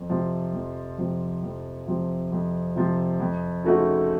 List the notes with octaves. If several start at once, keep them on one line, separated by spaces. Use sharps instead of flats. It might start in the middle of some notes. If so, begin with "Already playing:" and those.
Already playing: F2
C3 F3
F2
C3 F3
F2
C3 F3
F2
C3 F3
F2
C#3 A3 D#4 F#4